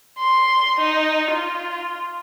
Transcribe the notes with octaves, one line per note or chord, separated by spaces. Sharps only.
C6
D#4
F4